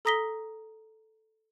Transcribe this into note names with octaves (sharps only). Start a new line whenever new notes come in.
A4 A#5 D#6 A#6 B6 G7